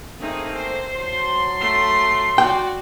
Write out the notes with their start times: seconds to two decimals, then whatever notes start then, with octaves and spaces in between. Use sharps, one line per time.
0.20 A3 A#3 C4 D#4 G#4
0.54 C5
0.97 F#3 A5 C6
1.60 A3 C7
2.38 F#4 D5 G5